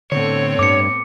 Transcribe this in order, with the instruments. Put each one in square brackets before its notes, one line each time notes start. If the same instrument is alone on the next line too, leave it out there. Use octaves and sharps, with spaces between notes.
[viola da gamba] A2 B3 C4 [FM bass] D3 [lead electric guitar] C#5
[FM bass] G2 [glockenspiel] D6 C#7